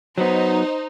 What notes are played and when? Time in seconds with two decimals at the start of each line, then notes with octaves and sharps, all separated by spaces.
0.18 F#3 B3 D#4 C5